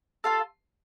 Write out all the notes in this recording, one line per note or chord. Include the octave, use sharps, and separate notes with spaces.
F4 A4 F5